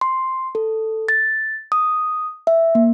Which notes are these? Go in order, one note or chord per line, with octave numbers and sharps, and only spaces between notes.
C6
A4
A6
D#6
E5
A#3